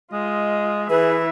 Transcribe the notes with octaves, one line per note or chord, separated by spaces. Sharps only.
G#3 F4 D#5
E3 G#4 B4 E5